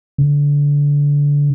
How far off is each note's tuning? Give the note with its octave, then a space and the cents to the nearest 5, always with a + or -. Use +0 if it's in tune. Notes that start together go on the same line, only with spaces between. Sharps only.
D3 -25